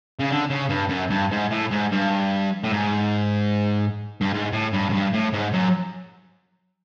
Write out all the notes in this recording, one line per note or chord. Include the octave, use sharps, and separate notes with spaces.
C#3
D3
C#3
G2
F#2
G2
G#2
A2
G#2
G2
A2
G#2
G2
G#2
A2
G2
F#2
G2
A2
G#2
F#2